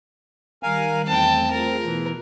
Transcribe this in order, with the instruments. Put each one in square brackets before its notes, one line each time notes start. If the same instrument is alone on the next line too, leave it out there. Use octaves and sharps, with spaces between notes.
[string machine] D#3 G3 F#6 [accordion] A#4 F5 G#5
[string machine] E2 A3 A#5 [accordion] C4 [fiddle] G5 A5
[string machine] F4 G#4 C5 [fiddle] A#4
[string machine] B2 [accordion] E3